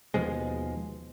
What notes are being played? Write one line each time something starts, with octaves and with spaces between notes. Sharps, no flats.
D#2 B2 F3 G#3